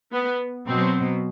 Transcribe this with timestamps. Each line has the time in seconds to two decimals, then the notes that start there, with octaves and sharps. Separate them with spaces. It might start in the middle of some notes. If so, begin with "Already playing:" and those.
0.12 B3
0.67 B2 F#3 C4